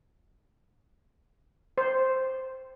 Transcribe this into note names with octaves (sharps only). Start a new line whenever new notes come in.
C5